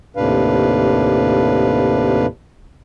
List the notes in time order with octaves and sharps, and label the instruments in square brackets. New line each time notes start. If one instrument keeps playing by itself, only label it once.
[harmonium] D#2 A2 C3 D4 B4 F5